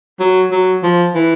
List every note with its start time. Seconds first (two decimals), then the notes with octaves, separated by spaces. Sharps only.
0.20 F#3
0.51 F#3
0.83 F3
1.15 E3